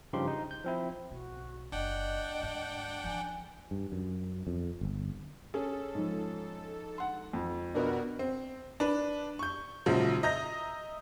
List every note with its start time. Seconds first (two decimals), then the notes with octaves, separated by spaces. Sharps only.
0.13 G2 C#3 F3 D#4 G4 C6
0.27 D#4
0.51 G6
0.64 F3 C4 E4
1.11 B1 F#4
1.72 F#1 D4 D#5 F#5 G5
2.40 D2 G#2
3.04 F3 E4 G#5
3.71 G2
3.92 F#2
4.47 F2
4.81 G1
5.54 C#4 G#4 A4
5.95 G#2 F3
6.98 F#5 C6
7.33 F2
7.74 B2 D4 F#4 A#4 B4 D#5
8.19 C4
8.80 D4 B4
9.39 C#6 G6
9.86 A#1 G#2 C#3 F3 F#3
10.23 D#5 E5 A#5 G6 A#6